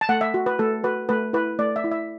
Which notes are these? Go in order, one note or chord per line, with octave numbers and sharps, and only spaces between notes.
A5
A3 F#5
E5
F#4
B4
A3 A4
F#4 B4
A3 B4
E4 B4
A3 D5
E5
E4
E5